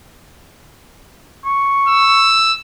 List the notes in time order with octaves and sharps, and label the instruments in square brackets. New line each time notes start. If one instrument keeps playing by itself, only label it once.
[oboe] C#6
[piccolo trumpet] E6